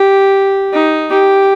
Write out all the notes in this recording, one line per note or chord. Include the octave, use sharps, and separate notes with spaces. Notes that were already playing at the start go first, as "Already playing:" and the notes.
Already playing: G4
D#4
G4